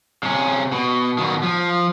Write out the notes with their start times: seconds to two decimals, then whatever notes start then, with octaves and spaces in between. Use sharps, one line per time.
0.23 C3 C#4
0.72 B2
1.18 B2 D#3
1.43 F3